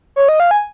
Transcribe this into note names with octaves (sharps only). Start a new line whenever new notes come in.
C#5
D#5
F5
G#5